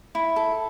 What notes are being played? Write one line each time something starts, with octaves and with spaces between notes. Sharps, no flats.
E4
A4